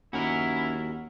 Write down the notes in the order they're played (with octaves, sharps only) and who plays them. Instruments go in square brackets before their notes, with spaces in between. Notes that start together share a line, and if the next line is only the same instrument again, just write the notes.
[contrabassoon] D#2 [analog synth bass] C#4 [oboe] E4 [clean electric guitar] F#4 A#4